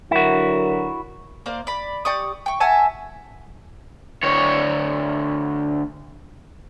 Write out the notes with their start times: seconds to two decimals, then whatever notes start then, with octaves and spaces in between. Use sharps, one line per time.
0.11 D3 F#3 E4 F#4 A#4
1.46 A#3 C5 D5
1.67 D5 B5
2.05 G4 D5 C#6 D#6
2.46 G5 C#6
2.60 E5 F#5 G#5 A5
4.24 D2 C#5